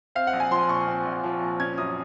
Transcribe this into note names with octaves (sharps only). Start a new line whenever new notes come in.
C4 F5
F#5
A#1
G#5
F3 C6
A#2 C#6
C4
A#1
F3
A#2
C#4 G#6
F#2 D#6